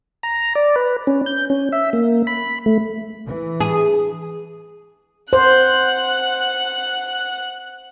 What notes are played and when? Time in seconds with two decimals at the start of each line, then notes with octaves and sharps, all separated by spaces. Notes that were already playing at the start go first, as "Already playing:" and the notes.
0.23 A#5
0.55 D5
0.76 B4
1.07 C#4
1.26 G6
1.50 C#4
1.72 E5
1.93 A#3
2.27 B5
2.66 A3
3.27 E3
3.60 G#4
5.33 C5 F#5 F#6